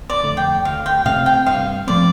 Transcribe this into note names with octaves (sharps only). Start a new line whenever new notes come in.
D5
F2 D3 A3
G5
D2 F5
G5
C3 A3 C4 F5
G5
G2 F5
F3 A3 C4 D5